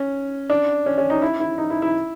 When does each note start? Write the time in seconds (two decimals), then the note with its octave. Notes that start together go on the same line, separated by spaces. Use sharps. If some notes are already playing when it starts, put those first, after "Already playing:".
Already playing: C#4
0.50 D4
0.86 C#4
0.98 C#4
1.10 D#4
1.22 E4
1.40 E4
1.58 D#4
1.70 E4
1.82 E4